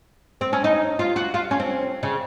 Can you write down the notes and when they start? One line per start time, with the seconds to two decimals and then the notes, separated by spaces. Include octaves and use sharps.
0.41 C4
0.53 C#4
0.64 D#4
0.99 F4
1.16 F#4
1.34 F4
1.51 C#4
1.60 C4
2.03 C#3